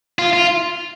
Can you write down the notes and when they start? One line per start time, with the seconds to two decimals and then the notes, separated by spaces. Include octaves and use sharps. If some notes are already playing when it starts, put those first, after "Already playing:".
0.19 F4
0.33 F4